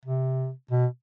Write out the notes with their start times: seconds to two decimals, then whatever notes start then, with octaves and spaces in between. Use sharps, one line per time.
0.05 C3
0.71 B2